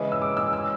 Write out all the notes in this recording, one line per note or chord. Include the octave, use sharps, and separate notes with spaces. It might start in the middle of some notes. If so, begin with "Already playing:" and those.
Already playing: C#3 E3 G#3 C#4
E6
D6
E6
E6